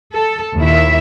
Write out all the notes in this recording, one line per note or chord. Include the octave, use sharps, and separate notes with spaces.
A4
D#2 A#2 E4 E5